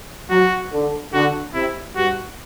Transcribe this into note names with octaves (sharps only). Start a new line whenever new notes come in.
F#3 F#4
D3
D3 F#4
C3 E4
G2 F#4